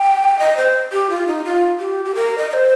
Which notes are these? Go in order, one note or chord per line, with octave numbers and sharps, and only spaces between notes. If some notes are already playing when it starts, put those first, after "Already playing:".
Already playing: G5
D#5
C5
G4
F4
D#4
F4
G4
G4
A#4
D#5
D#5
C5